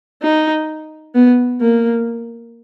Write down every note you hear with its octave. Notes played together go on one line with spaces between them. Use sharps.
D#4
B3
A#3